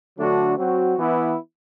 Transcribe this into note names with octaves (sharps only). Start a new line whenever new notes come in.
D3 F#3 A3 D4 F#4
F#3 C4 F#4
E3 B3 E4